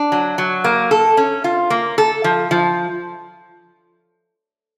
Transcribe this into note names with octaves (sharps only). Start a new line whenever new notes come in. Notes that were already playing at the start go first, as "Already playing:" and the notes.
Already playing: D4
F#3
F#3
A#3
A4
C#4
F4
A#3
A4
F3
F3